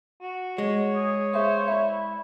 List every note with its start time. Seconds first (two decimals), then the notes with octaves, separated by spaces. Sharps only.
0.21 F#4
0.58 G#3 C#5
0.95 G#4
1.33 G#4 C5 E5 F5
1.68 E4 D5 E5